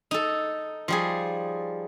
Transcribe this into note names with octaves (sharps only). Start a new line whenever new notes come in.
D#4 A4
F3 G3 G#4